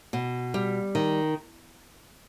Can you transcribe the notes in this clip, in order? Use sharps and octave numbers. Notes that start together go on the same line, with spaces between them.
B2
G3
D#3